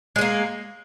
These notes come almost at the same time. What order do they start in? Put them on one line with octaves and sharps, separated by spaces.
G#3 G#4 A#3